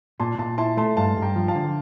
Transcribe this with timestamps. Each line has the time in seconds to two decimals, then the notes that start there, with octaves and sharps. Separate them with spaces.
0.20 A#2 A5 C6
0.38 A#2 A5 C6
0.58 E4 A5 C6
0.77 A3 A5 C6
0.97 G2 F5 A5
1.17 G2
1.22 G5 A#5
1.36 F3
1.48 F5 A5
1.55 D3